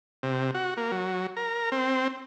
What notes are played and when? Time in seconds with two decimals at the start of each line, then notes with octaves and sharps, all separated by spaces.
0.23 C3
0.54 F#4
0.77 A#3
0.92 F#3
1.37 A#4
1.72 C4